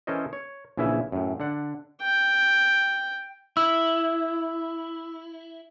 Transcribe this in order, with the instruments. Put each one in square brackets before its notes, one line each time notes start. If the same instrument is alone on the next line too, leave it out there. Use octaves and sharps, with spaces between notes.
[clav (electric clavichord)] E3 C#4 A4 A#4 C5 D#5
C#5
A#1 C#3 E3 E4 E5 G#5
F#2 A2
D3 D4 F#5
[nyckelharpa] G5
[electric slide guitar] E4 [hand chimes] E6